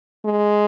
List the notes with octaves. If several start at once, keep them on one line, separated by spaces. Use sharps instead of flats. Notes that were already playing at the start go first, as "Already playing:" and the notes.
G#3